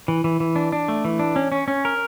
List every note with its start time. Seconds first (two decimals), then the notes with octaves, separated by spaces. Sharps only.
0.08 E3
0.24 E3
0.40 E3
0.56 D4
0.72 D4
0.88 A3
1.05 E3
1.19 D4
1.36 C#4
1.52 C#4
1.68 C#4
1.85 A#4